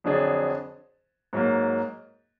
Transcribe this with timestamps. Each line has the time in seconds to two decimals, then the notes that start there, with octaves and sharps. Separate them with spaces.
0.04 F2 D3 F#3 D4 G#4
1.33 G#2 F#3 A#3